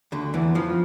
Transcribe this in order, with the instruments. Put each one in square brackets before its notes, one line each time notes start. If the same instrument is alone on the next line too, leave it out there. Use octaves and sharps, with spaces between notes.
[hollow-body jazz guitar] D2 D3
E2 E3
F2 F3